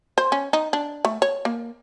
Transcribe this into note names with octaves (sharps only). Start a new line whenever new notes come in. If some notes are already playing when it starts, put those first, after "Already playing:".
C5
C#4
D#4
D4
A3
C#5
A#3